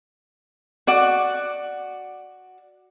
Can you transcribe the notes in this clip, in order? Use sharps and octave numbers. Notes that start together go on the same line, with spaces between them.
F#4 D5 F#5